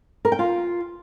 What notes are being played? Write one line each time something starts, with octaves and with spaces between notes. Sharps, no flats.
A#4
G5
F4